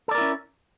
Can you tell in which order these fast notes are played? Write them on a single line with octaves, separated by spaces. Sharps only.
A4 D5 A#4 E4 C#4